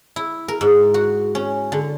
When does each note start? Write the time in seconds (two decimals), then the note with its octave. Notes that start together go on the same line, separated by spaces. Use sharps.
0.16 E4
0.48 A#4
0.61 G#2
0.94 F#4
1.35 C#4
1.72 D3